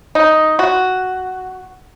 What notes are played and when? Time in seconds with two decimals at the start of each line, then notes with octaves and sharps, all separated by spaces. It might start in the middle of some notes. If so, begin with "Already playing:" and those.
0.15 D#4
0.59 F#4